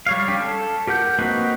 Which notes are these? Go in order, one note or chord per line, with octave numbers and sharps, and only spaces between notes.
G3 C#5 F5
C#4 G4
A4
G4 A#4 F#5 G6
A#3 C4 D#4 F#4 B4